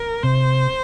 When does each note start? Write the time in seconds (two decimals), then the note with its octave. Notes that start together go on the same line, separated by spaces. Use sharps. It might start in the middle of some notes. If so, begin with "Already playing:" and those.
Already playing: A#4
0.23 C3 C5